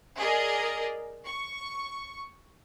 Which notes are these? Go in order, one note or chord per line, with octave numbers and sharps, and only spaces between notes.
G#4 A#4 D5 D#5
C#6